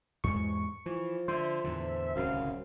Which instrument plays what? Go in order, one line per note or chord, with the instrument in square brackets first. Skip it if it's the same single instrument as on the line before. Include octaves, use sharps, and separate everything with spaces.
[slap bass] E2 G#2 G#3 [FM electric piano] C#6
[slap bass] E3 [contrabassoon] F3
[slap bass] D3 [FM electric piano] C5 [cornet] E5
[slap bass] E2 A2 D3
[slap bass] D1 C2 C#3 [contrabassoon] F#2 [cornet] F5